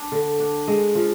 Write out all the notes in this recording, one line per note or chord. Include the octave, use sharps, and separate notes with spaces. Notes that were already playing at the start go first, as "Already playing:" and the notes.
Already playing: D4
D3
D4
G#3
F3